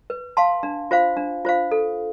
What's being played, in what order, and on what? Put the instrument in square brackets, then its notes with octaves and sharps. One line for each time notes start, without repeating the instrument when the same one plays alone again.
[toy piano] B4
F5 A5 C6
D4
F4 C5 F5
D4
F4 C5 F5
A4